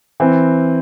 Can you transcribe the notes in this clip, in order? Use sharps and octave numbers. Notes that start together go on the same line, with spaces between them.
E3 C4